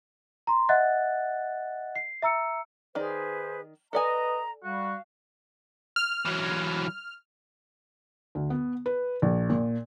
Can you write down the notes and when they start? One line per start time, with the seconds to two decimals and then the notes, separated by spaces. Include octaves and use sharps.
0.47 A#5 C6
0.69 D#5 E5 F#5 F#6 A6
1.95 C7
2.22 E5 A#5 E6 C#7
2.95 D#3 D#4 G#4 B4 C5 D5
3.93 A4 B4 D5 D#5 G#5 A#5
4.63 G3 F#4 F5
5.96 F6
6.25 E3 F#3
8.35 D2
8.50 B3
8.86 B4
9.22 A#1
9.50 A#2